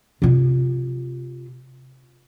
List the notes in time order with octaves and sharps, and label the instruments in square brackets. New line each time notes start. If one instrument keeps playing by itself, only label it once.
[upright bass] C3 F4